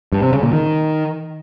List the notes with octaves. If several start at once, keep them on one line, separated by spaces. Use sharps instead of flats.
G2
C3
C#3
A#2
D#3